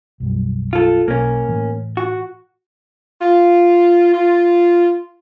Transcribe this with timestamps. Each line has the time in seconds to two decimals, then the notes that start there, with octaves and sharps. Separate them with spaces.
0.20 B1 F#2 G3
0.73 F4 A4
1.08 B1 A#3 C#4
1.48 A2 E3
1.97 F#4
3.20 F4
4.13 F4